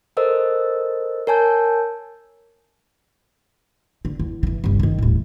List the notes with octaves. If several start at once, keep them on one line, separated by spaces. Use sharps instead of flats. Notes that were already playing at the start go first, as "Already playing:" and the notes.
A4 A#4 C5 D#5 E6
A#4 C#5 G#5 A5 G6
D3
E2
D3 E3
G1 C#2
D3 D#3
D#1 A2